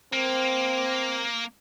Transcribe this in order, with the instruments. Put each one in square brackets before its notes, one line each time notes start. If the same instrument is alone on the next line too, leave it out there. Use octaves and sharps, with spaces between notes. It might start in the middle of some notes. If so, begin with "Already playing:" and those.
[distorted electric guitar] A#3 [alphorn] C4